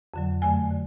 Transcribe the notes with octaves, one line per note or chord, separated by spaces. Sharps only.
F2 D3 F#3
F#2 D3 F#3 A3 G#5
D3